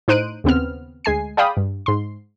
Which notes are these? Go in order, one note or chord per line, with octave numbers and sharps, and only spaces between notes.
A2 D#4 C5 F#6 D7 D#7
D#2 C#3 B3 C4 F6
D2 G#3 G#5 C7
G#4 D5 F5 G5 B5 D#6
G2
G#2 C6